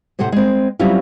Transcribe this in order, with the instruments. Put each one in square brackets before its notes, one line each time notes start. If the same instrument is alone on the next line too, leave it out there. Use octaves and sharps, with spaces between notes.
[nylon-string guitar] A2 C3 A3 C5 F#5
G#3 C4
F#3 G3 C4 C#4 E4 F4